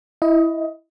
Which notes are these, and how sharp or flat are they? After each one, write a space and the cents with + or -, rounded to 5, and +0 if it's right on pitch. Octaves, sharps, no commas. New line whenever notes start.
E4 +0 D#5 +20